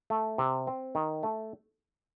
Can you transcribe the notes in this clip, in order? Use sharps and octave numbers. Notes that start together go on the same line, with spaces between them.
A3
C3
C4
D#3
A3